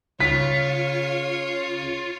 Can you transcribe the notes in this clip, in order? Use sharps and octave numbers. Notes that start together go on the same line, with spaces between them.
C#3 F4 C#5 B6